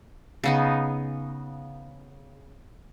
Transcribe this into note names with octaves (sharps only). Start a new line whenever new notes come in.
C#3 B3 D#4